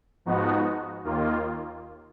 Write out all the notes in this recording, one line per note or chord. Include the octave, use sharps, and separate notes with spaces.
G#2 F3 B3 D#4 F#4
D#2 D#3 A#3 F4